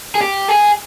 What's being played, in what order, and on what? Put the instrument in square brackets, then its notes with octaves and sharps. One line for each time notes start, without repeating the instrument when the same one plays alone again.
[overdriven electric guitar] G#4
G4
G#4